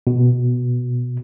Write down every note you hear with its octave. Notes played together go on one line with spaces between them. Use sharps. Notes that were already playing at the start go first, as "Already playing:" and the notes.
B2